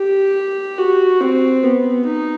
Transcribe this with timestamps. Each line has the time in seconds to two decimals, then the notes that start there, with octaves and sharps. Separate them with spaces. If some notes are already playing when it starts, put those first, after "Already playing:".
Already playing: G4
0.78 F#4
1.21 C4
1.63 B3
2.05 D#4